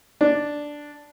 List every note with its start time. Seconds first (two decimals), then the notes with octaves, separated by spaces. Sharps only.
0.21 D4